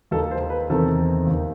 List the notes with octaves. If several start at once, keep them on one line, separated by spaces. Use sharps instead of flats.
D#2 D#3 A4
C5
B4
E2 C3 D#3 A4
D#2 D#3